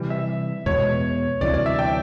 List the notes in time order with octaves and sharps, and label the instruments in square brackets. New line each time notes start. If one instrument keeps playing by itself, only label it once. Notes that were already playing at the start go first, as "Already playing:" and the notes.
Already playing: [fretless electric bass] C3 E3 G3
[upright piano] E5
[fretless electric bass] E2 B2 G#3 B3 [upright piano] C#5
[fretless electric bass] D2 C3 E3 G3 [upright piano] D5
[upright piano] D5
E5
G5